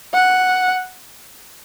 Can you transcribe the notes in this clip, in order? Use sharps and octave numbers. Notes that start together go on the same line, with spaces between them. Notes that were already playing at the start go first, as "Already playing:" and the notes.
F#5